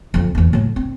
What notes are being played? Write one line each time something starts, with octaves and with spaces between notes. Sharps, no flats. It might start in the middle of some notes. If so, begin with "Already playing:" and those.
F2 F3
E2 F4
A2 F#3
C4